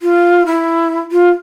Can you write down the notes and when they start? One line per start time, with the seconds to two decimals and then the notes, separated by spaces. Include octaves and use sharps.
0.01 F4
0.46 E4
1.12 F4